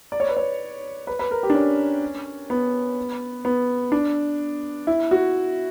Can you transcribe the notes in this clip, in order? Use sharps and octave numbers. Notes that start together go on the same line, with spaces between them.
D5
C#5
B4
C#5
B4
B4
A#4
G4
D4
C#4
B3
B3
D4
E4
F#4